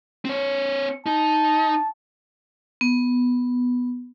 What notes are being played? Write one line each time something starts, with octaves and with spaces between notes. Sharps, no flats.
C4 C#5
D#4 A5
B3